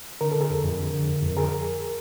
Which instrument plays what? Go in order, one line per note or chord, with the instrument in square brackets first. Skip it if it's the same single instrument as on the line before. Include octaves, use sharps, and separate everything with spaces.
[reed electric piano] D3 A#4
D3 A4
G#4 A#4
F2
F2
D3
D3
F2
F2
D3 G#4 A#4